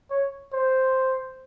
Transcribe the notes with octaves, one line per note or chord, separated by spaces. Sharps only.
C#5
C5